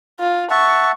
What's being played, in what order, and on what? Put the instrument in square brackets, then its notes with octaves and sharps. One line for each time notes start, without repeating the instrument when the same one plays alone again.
[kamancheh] F4
[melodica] E5 F#5 A5 [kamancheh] C#6